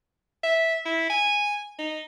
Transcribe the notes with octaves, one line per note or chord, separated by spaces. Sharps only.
E5
E4
G#5
D#4